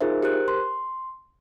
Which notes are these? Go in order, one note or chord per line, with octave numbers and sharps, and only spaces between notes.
D#4 F4 G#4 A#4 C5 E5
G4 A#4 C5 F#6
C6